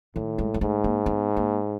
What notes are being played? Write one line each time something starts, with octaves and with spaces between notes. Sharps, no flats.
A2 D#3
G#3
G#3
G#2 A3
A#3
B3
A#3